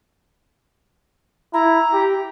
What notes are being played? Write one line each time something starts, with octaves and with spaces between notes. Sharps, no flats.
E4 A#5
G4